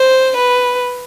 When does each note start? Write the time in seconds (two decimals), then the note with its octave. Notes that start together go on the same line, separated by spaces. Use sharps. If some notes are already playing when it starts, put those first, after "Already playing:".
Already playing: C5
0.37 B4